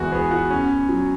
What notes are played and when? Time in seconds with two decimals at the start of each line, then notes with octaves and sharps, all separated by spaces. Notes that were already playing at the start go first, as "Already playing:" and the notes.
Already playing: E2 E3 G#3 F#4 G#4
0.12 B3 G#4
0.31 F#4
0.51 C#4
0.89 F#3